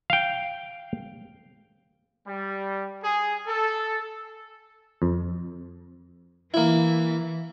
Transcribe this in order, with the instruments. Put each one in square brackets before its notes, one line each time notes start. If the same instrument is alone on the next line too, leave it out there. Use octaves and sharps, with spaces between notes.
[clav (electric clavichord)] F5 G5
[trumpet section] G3
G#4
A4
[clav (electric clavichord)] F2
[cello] E3 [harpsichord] A#3 E4